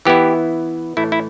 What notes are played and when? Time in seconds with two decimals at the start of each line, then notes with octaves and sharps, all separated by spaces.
0.05 E3 B3 E4 G4
0.97 A2 E3 A3 E4
1.12 E4